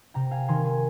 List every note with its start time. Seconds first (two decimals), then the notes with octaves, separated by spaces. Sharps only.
0.14 C3 G5 A#5
0.31 F5 G#5
0.48 D#3 G#5 C6
0.65 G#5 C6